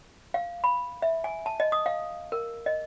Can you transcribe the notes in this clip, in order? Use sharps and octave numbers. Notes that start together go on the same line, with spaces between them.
F5
B5
E5
G#5
A5
D#5
D#6
F5
A#4
D#5